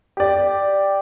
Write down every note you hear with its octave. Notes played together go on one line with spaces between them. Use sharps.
G4 D5